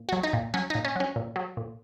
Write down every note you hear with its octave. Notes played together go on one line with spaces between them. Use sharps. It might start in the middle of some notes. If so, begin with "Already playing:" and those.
Already playing: A#2
F#3 F#4
D#4
A#2
F#3 C#4
A#2 D#4
C#4
F#3 C#4
A#2
F#3
A#2